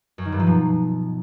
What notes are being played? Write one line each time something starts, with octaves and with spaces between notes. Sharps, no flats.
F#2
D#3
G2
F3
B2